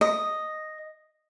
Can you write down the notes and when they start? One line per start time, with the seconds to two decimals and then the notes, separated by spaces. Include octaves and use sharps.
0.01 D#5